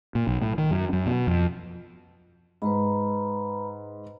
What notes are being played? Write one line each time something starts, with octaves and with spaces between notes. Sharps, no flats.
A#2
B1
A2
D#3
F#2
F#2
B2
F2
G#2 B4 A#5 B5